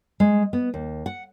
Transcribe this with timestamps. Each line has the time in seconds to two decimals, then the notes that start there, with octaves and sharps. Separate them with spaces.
0.20 G#3
0.53 B3
0.74 D#2
1.06 F#5